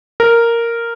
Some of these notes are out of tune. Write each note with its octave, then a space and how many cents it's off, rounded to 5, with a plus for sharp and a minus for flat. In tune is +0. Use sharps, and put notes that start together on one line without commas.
A#4 -5